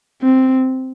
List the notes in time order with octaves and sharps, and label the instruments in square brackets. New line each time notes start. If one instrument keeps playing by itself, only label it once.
[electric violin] C4